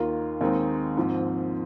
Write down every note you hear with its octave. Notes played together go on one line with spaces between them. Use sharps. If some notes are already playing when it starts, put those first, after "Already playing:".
Already playing: D#2 D#3 A#3 F4
D#2 D#3 G#3 C4 D#4
G#2 F3 C4 F4